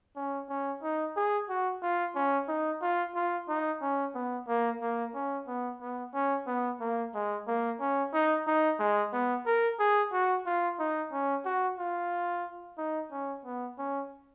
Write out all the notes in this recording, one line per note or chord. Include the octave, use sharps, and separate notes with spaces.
C#4
C#4
D#4
G#4
F#4
F4
C#4
D#4
F4
F4
D#4
C#4
B3
A#3
A#3
C#4
B3
B3
C#4
B3
A#3
G#3
A#3
C#4
D#4
D#4
G#3
B3
A#4
G#4
F#4
F4
D#4
C#4
F#4
F4
D#4
C#4
B3
C#4